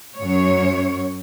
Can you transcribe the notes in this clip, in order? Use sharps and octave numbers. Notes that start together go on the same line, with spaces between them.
F#2 C#5